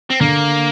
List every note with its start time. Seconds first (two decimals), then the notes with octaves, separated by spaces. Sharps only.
0.10 C4
0.20 D3 A#3